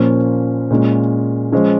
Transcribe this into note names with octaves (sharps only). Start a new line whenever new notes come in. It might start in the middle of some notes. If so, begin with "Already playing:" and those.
Already playing: A#2 F3 A#3 C#4
A#2 G#3 C#4
F3 G#3 C#4